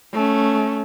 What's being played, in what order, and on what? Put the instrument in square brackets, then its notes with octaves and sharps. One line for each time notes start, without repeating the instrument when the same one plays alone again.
[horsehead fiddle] A3 C#4